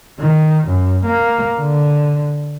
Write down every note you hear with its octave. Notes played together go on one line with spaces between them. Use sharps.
D#3
F#2
A#3
D3